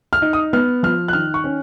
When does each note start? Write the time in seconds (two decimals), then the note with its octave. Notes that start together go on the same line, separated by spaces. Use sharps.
0.13 F6
0.22 D#4
0.33 D#6
0.53 B3 F6
0.83 F3 F6
1.08 F#6
1.13 D#3 F6
1.34 C#6
1.44 C#4